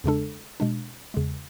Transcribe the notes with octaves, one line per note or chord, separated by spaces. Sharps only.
E2 C#3 G#3 D4 A4
B2 G#3 D4
E2 C#3 G#3